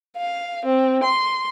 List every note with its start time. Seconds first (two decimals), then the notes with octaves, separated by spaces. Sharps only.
0.17 F5
0.65 C4
1.03 C6